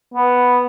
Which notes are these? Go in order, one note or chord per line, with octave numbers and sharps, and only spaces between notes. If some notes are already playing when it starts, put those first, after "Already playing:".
B3